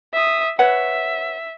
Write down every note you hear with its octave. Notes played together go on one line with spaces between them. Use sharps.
E5 D#6
B4 C#5 E5 F#5